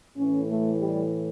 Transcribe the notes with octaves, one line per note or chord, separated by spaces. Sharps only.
A2 E3 C#4
A3
G3